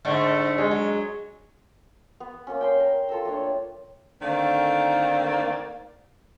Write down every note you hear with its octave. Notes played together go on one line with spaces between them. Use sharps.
G#2 D3 A3
G#3
F#3
B3
A#3 B3 C#4
G5 A5 C6
A#4
F4 A4 A#5 E6
A3 A#3 D4 C#5
D3 D#3 A3 A#3 C4 D5